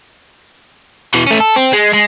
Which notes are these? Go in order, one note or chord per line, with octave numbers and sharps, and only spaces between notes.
B2 E3
A3 C#4
A4
C4
G#3
G#3